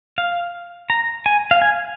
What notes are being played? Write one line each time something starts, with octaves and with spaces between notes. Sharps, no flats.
F5
A#5
G#5
F5
G#5